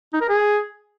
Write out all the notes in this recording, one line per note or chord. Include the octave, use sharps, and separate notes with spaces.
D#4
A#4
G#4